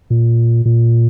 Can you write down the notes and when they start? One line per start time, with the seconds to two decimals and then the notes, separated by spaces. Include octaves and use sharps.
0.10 A#2
0.65 A#2